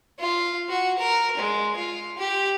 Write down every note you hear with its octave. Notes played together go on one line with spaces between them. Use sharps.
F4
F#4
A#4
G#3
F4
G4